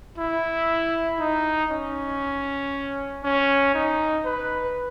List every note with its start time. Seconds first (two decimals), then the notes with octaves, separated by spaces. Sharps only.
0.18 E4
1.19 D#4
1.71 C#4
3.24 C#4
3.74 D#4
4.25 B4